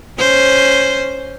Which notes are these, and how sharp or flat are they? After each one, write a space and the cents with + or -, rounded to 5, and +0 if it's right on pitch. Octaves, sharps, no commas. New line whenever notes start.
C#4 +0 C5 +0